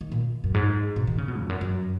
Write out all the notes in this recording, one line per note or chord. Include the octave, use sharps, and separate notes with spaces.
D#3
A#2
F#2
G#2
B2
D#3
C#3
B2
F2
F#2
F#2